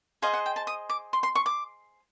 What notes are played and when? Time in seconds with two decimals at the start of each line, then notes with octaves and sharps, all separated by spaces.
0.22 G#4 C5 D#5 F5
0.33 F#5
0.46 G5
0.56 A5
0.67 D#6
0.89 D6
1.13 C6
1.23 C6
1.35 C#6
1.46 D6